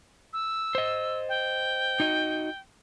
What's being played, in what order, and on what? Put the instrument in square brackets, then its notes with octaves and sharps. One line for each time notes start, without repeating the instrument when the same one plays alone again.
[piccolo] E6
[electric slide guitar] C5 D#5
[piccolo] G5
[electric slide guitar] D#4 F#4 D#5